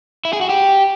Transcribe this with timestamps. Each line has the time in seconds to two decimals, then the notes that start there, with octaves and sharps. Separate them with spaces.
0.25 E4
0.33 G#4
0.41 F#4
0.49 G4